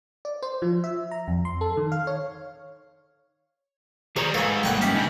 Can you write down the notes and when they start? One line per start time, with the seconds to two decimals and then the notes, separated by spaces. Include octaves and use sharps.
0.25 D5
0.42 C5
0.62 F3
0.84 E5
1.11 A#5
1.28 F2
1.45 C6
1.61 A4
1.77 D#3
1.92 F5
2.07 C#5
4.16 D#3 G3 G#4 C5 C#5 A#5
4.34 G#2 D#3 A4 B4 C#5 F5 G#5
4.63 G3 A#3 F#5 G5 C#6
4.81 C#4 G4 E5
4.95 G2 C#3 D#4